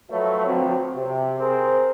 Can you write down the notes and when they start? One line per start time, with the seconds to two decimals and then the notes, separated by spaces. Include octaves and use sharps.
0.11 F3 F#3 A3 B4 C#5 E5
0.46 D3 F3 F#3 C4
0.96 C3
1.39 C4 G#4 A#4 C5